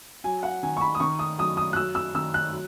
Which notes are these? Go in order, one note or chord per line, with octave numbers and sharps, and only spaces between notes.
F#3 G#5
F#5
D#3 G#5
C#6
B5
D#6
D#3 C#6
D#6
F#2 D#6
D#6
F#6
F#3 E6
E6
D#3 E6
F#6
F#3